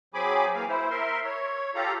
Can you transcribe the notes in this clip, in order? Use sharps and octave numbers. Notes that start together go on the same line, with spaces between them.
F#3 C4 G#4 G#5 B5 D6
E3 A#3 F5
E4 C5
A#4 E5 C6
C#5
F4 G4 A4 F5 A#5